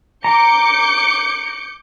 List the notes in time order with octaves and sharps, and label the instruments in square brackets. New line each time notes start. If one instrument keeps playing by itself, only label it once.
[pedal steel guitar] A#5 [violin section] D6 G6 C#7